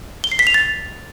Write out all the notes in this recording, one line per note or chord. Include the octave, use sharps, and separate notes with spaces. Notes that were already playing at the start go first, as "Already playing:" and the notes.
G7
C7
B6
F7
A6